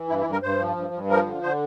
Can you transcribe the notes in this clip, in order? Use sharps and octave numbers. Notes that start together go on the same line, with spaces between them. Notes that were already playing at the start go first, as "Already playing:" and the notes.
Already playing: E3
G2 E4
E4
G2
A#4
G2 C5
F3
G2
G2
F3 A#4
D3
D3 C5